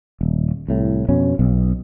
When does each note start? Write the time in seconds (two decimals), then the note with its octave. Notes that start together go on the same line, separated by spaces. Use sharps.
0.21 D#1
0.68 C2 A2
1.08 F2 B2 C#4
1.39 B1 B2